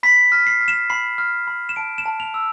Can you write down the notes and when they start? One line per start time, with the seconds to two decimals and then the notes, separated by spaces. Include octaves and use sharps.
0.03 B5 B6
0.32 F6
0.47 C7
0.61 F6
0.68 E7
0.90 B5 C7
1.18 F6
1.47 B5
1.69 E7
1.76 A5 D7
1.98 E7
2.06 A5
2.20 F7
2.34 E6